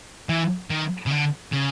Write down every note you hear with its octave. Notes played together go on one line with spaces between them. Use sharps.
E3
D#3
C#3
D3
C#3